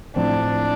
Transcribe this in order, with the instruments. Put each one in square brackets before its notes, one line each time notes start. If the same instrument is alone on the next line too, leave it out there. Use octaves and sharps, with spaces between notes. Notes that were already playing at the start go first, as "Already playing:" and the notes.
[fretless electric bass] A2 F3 C4 [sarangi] D4